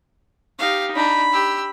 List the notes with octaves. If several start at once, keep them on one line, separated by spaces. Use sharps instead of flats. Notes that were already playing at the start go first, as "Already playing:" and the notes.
D#4 G4 F5
D4 D#4 B5
G4 E6